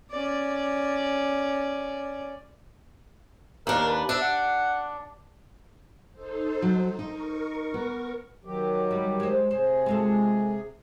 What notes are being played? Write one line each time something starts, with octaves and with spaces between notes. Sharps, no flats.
C#4 D5
D#2 D4 A#4
B4
D4 E5
F#5
D#4 A4 C5
F#3
D#4 A#4 C#6
B3
D#3 F#3 G4
G3
G#3 C5
C3 G#4 C5
G#3 F4 A4